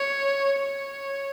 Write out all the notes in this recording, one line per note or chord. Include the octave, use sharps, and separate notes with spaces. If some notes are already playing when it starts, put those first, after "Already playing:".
Already playing: C#5
C#5